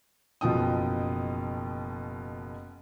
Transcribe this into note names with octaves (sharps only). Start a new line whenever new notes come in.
F#1 B2 F3 G5 D#6